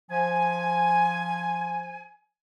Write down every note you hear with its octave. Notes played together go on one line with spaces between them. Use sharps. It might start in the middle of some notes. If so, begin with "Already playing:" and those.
F3 G#5